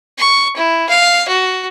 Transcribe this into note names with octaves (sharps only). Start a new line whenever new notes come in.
C#6
E4
F5
F#4